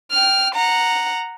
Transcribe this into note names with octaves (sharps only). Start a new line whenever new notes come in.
G5 F6
F#5 A#5